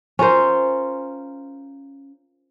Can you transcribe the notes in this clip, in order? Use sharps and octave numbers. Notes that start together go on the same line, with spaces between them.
C#4 F4 A#4 C5